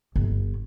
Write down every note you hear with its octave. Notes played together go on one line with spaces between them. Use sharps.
G1